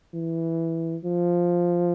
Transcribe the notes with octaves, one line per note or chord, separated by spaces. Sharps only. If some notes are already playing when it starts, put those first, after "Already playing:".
E3
F3